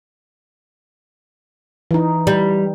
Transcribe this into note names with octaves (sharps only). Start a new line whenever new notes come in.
E3 D#4
G3